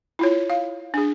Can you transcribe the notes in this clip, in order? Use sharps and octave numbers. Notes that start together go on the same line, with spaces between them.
E4 F4 C#5
F5
D4 G#4